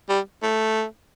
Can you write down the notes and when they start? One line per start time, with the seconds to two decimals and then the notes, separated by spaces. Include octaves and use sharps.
0.09 G3
0.43 A3